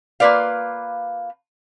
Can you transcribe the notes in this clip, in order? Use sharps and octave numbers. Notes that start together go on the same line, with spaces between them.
A#3 F4 B4 D5 F5